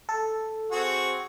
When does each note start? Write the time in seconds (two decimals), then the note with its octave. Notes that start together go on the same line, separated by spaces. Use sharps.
0.09 A4
0.72 C4 F#4 G#4